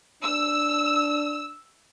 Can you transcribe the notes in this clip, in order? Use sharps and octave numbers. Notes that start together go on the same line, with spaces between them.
D4 E6